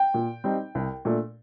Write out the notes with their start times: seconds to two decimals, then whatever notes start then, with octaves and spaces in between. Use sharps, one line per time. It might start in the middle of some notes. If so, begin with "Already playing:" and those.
Already playing: G5
0.14 A#2
0.44 G3 C4 D#4
0.75 C2
1.05 A#2 A3 D4